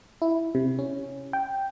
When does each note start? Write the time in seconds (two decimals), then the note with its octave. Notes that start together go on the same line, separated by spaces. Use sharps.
0.22 E4
0.55 C3
0.79 C#4
1.33 G5